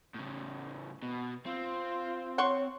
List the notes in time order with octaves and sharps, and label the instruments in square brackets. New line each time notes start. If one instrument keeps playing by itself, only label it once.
[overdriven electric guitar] A2 C#3
B2
[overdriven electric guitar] C4 [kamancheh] F4
[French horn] C#5 [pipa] F#5 C6 C#6